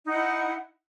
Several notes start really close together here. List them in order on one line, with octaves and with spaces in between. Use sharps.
D#4 F#5 E4